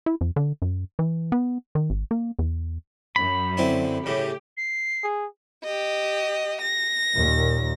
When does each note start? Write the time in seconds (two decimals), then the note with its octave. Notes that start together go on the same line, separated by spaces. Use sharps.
0.06 E4
0.21 F2
0.36 D3
0.62 F#2
0.99 E3
1.32 B3
1.75 D#3
1.90 G#1
2.11 A#3
2.39 E2
3.16 F#2 B5
3.57 D3 C4 E4
4.06 A2 C#3 G4
4.57 C7
5.04 G#4
5.63 G4 D#5
6.61 A#6
7.15 D#2 A#2